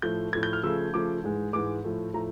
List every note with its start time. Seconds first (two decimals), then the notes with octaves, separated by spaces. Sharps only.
0.02 A2 F3 A3 G6
0.33 A2 F3 A3 G#6
0.43 G6
0.53 F6
0.63 C#3 F3 A3 E6
0.93 C#3 F3 A3 D6
1.23 G#2 E3 G#3
1.53 G#2 E3 G#3 D6
1.84 A2 F3 A3
2.14 A2 F3 A3 A#5